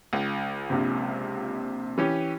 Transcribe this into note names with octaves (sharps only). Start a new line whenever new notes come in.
C#2
A#1 C3
E3 C#4 G4